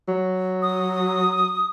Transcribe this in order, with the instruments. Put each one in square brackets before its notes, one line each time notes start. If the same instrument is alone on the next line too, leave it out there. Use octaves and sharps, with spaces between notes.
[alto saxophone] F#3
[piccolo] D#6